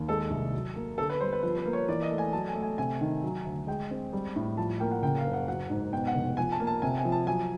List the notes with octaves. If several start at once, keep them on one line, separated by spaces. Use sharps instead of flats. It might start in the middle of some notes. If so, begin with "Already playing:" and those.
Already playing: D#2
G#3 A4
C2
F#3
A#3
D3 A4
B4
G3 C5
B4
F3 B4
B4
A#3
C#5
E3 D5
D#5
A3
G#5
F#3 A5
G#5
A3
G#5
C3 G#5
D#3
F#3
D2
G#3 G5
C4
G3
A2
F3 A5
A#3 G5
F#5
C#3 G5
F5
F#1
F#5
F#3 F#5
G#2
B2 G5
F#5
F1
F3 G#5
A5
A#3
A5
C3 G#5
G#5
F3
A5
F#3 G#5